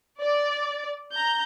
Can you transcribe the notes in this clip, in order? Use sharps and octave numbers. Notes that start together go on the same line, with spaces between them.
D5
A#5 G6